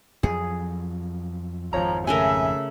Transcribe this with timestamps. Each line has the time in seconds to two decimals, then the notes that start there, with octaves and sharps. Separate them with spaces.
0.23 F2 F3 F#3 G#4
1.73 G#1 F2 F3 C#5 A#5
2.07 C#3 A3 A#4 E5 G#5